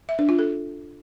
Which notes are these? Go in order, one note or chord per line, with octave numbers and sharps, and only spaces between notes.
E5
D4
F4
A4